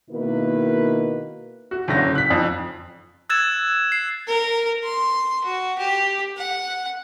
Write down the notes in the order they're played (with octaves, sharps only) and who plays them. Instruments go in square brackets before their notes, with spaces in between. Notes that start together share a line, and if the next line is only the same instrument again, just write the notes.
[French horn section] B2 D#3 A#3 E4 B4
[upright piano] F#4
F#1 D3 C#4 A#6
F#6 B6
F2
[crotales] E6 F#6 G#6 A6 E7
C7
[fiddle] A#4
C6
F#4
G4
F#5